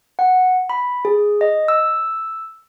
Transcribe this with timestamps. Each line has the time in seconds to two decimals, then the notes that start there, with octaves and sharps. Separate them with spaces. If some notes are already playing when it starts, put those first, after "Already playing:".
0.19 F#5
0.70 B5
1.05 G#4
1.41 D#5
1.68 E6